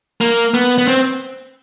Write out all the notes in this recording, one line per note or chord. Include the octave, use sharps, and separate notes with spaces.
A#3
B3
B3
C4